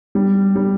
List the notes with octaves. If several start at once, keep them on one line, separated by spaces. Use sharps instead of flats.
G3
G3